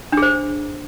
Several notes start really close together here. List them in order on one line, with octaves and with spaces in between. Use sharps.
D4 G#4 C5